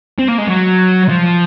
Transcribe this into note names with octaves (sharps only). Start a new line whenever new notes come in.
C4
A#3
G#3
F#3
F3